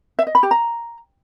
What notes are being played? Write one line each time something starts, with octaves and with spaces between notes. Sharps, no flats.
E5
D#5
B5
G4
A#5